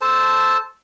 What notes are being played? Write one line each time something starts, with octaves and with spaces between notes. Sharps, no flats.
A4 C5 A5